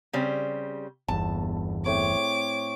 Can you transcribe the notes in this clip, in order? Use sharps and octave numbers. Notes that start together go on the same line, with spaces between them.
C#3 G3 C4
G1 E2 A5
A2 C4 C#5 D6